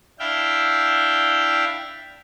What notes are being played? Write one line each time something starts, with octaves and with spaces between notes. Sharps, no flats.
D4 E4 E5 F5 G5